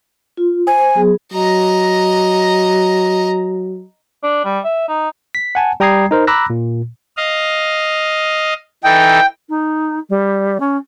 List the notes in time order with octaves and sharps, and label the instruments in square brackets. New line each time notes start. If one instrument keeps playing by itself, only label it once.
[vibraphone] F4
[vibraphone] C5 [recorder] G#5
[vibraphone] F#3 B3 G#4
[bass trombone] F#3 [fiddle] D#5 A#5
[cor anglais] D4
G3
E5
D#4
[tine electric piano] B6
F#5 G#5 A5
G3 G5 A#5 D#6 G#6 C7
D#4 A#4 C5
A#5 B5 D6 E6 F#6 A#6
A#2
[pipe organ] D#5 F5
[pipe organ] E3 D#4 A4 [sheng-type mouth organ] G5
[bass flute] D#4
G3
C#4